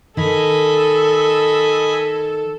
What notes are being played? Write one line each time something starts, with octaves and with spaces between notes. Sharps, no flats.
D#3 A4 D#5 G#5 B5